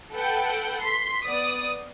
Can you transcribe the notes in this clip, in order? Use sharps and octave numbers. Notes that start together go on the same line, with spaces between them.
A4 B4 F#5 G5
C6 B6
B3 D5 D#6